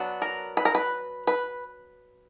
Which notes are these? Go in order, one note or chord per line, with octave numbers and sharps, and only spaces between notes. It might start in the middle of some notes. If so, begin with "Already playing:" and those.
Already playing: F#3 B3 D4
A#4
B4
A#4
B4
B4